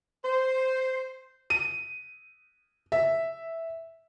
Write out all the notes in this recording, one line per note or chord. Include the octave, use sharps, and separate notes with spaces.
C5
D#7
E5